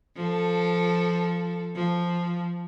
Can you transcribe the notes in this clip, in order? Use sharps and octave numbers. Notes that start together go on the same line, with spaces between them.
F3 A4
F3